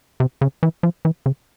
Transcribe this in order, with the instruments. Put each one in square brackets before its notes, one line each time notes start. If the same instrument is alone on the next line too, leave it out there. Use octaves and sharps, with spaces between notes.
[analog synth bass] C3
C#3
E3
F3
E3
C#3